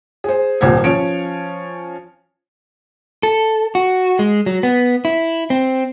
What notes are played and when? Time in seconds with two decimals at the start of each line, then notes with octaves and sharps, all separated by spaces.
0.24 G#4 C5
0.61 D#1 C2 A#2 C5 F#5 G#6
0.84 F3 C#4 C#5 D7
3.23 A4
3.75 F#4
4.19 G#3
4.46 F#3
4.63 B3
5.05 E4
5.50 C4